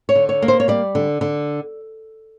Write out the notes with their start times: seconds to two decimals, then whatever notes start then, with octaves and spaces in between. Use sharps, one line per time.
0.09 C#5
0.15 D3
0.29 C#5
0.42 A#3
0.48 C5
0.60 C#5
0.68 G3 D5
0.95 D3
1.21 D3